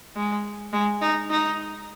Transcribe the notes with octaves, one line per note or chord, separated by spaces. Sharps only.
G#3
G#3
D#4
D#4